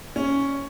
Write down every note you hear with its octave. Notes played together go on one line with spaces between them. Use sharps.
C#4